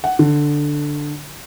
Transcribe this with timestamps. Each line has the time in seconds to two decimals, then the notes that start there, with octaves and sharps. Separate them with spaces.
0.04 F#5
0.19 D3